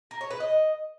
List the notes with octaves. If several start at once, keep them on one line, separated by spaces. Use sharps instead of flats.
A#4
C#5
B4
D#5